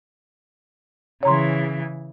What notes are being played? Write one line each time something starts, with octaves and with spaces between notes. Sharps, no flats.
C#3 E3 C#5 A#5 C6